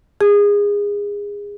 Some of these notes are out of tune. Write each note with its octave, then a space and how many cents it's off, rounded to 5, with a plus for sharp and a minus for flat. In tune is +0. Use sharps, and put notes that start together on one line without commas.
G#4 -25